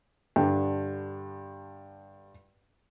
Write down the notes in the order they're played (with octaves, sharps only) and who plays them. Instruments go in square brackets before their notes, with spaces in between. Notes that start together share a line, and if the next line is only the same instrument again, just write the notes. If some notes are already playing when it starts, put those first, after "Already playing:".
[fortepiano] G2 D3